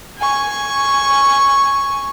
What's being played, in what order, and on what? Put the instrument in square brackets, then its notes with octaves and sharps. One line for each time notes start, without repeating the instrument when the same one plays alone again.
[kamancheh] G#5 C#6